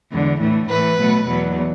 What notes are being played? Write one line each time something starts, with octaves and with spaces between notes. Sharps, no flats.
E2 D3 G#3
A2 E3 A3
A2 E3 A3 B4
B2 F#3 A3
E2 B2 F#3